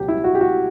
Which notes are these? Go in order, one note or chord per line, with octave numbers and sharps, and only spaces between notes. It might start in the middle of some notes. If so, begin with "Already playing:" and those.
Already playing: C#2 B2 F#3 G4
E4
F#4
G4
F#4